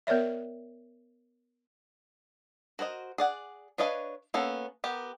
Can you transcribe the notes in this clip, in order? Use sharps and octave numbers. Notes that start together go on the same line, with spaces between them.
B3 A#4 C#5 D5 E5
F#4 A#4 C5 D#5
G#4 D5 F#5
D4 B4 C#5 D#5 F5
A#3 B3 C#4 A4
B3 G4 A#4